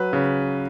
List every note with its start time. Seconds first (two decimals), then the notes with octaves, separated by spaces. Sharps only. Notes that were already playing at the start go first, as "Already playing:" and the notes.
Already playing: F#3 B4
0.13 C#3